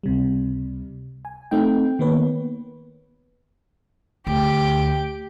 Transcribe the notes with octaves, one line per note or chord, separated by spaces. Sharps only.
C#2 C3 G3
G#5
A3 C4 D#4 G5
D#3 A#3 B3 B4 C#5
D2 G4 D7